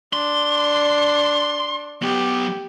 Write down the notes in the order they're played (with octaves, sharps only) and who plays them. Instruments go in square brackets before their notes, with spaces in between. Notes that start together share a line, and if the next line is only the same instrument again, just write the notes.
[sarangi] D4 [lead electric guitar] C6
[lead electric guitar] F#3 B3 [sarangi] G4